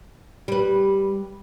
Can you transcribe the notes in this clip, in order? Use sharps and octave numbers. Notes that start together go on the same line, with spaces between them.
G3 B4